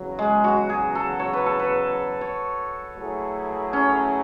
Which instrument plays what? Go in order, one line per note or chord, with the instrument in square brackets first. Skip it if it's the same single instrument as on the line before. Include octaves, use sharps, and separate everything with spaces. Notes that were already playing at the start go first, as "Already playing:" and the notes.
Already playing: [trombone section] E2 C#3 F#3
[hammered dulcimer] G#3
F#4
G#4
A4
C#5
B4
A4
B4
C#5
[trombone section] F#3 A3 E4 G#4
[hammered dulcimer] C#4